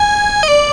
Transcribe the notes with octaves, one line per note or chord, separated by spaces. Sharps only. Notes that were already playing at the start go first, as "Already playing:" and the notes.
Already playing: G#5
D#5
D5